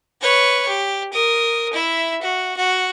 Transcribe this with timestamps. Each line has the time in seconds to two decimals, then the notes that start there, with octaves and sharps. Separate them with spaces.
0.22 B4 C#5
0.68 G4
1.13 A#4 D#6
1.74 E4 E5
2.22 F#4
2.57 F#4